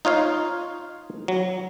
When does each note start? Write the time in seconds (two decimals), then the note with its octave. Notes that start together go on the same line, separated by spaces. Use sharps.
0.05 D#4 F4 C#5 F5
1.28 F#3